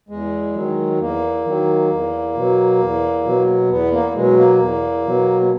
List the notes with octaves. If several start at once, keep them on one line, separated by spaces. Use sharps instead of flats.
E2 G#3
D#3 F#3
E2 A#3
D#3 F#3
E2
B2 F#3
E2
B2 F#3
E2 B3
A#3
B2 F#3 G#3
A#3
E2
B2 F#3